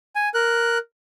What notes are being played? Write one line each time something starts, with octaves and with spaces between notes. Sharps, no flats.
G#5
A#4 F#6